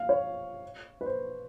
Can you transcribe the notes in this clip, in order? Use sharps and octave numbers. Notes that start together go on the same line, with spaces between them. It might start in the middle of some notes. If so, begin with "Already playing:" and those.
Already playing: F5
C#5
B4
C5